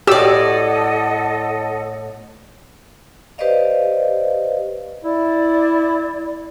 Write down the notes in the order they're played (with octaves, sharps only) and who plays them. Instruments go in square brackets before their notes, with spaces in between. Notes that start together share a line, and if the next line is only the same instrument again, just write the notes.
[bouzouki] A2 D5 [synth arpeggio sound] F#4 G4 E6 [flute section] A4 D#5 F#5
[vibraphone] G4 B4 C5 D5 D#5 F5
[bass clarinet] E4 [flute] D5